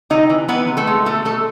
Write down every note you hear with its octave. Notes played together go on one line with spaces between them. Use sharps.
C3 D#4 D#5
E3
E3 B3 B4
C3
A3 A4
G#3
B2 A3 A4
B2 A3 A4